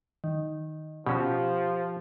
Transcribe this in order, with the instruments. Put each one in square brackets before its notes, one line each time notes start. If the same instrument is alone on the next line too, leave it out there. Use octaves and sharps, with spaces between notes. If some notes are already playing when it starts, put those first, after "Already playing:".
[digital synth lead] D#3
[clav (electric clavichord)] B2 C#4 F#4 [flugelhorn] F3 [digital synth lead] G4